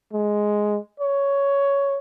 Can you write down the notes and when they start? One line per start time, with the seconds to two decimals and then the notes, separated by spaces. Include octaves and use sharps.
0.13 G#3
1.00 C#5